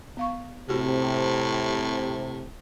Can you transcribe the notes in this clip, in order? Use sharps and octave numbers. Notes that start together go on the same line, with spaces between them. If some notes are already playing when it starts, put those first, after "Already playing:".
B3 F5 C#6
A2 C3 C4 F#4 G4